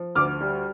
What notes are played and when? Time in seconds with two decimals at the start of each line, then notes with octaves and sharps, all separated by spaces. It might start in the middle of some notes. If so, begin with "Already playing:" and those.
Already playing: F3
0.15 D2 D6 F6
0.41 G3